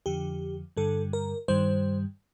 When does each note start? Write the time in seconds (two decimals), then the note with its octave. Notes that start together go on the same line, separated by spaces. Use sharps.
0.06 F2 D3 F3 G4
0.77 G2 D3 G3 A4
1.13 A#4
1.48 G2 D#3 G3 C5